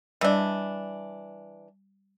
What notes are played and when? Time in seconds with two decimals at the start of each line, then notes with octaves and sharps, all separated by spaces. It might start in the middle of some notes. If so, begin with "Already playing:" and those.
0.21 E3 G3 D4 D#5